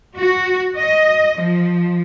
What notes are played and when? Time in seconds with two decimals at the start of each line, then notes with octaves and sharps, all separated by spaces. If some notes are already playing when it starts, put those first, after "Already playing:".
0.16 F#4
0.77 D#5
1.40 F3